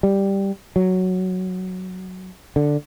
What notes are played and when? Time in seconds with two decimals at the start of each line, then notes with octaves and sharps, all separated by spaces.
0.03 G3
0.76 F#3
2.56 D3